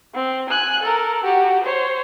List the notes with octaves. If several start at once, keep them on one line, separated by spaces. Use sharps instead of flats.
C4
G#5 F#6
A4 A#4
F#4 G4
C5 C#5